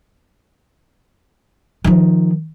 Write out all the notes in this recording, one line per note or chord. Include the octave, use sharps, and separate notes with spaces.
D#3 F3